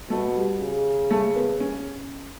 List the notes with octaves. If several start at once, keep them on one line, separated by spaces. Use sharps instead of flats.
B2 A3
G3
C#3
A3
B3
C#4